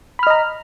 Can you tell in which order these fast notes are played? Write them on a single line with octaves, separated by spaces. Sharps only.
B5 F6 D#5 A#5